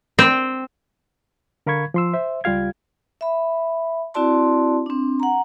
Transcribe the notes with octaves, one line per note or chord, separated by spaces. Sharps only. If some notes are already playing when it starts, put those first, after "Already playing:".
C4
D3 A#4 F5 B5 C#6 G#6
F3 C6 E6
C5 E5
C#2 G3 F4 G4 F5 G#6
E5 B5
C4 E4 F#4 D5 A5 C6
C4 D4
F#5 A#5